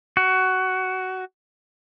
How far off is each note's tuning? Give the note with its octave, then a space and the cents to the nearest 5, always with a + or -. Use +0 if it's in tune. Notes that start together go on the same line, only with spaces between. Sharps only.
F#4 +15